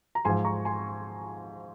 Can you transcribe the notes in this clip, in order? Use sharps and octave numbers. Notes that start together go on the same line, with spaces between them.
A#5
G#2 F3 G#5 C6
A#5 C#6
G#5 C6